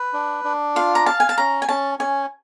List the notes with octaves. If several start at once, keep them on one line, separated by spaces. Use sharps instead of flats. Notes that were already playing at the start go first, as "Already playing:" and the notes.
Already playing: B4
D4
D4
F4 F5
A#5
F5 A5
G#5
A5
C#4 A#5
G#5
C#4 A5
C#4 G#5